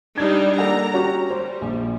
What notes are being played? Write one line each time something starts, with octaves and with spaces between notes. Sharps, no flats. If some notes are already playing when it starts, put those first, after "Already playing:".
G3 D4 D#4 G#6
A#3 A4 F#5 A#5
C#4 F#4 G4
G3 C5
A#1